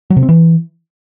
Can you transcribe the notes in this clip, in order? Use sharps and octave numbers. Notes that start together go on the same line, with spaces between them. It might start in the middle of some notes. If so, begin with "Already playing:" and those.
F#3
C3
C4
E3